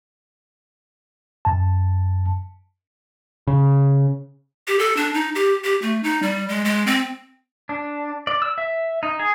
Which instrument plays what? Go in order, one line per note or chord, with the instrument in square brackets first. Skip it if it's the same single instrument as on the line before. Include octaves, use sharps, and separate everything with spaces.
[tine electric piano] F#2 A5
[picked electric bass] C#3
[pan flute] G4
A4
D4
D#4
G4
G4
A3
D#4
G3
G#3
G#3
C4
[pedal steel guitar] D4
D5
E6
E5
D#4
G#4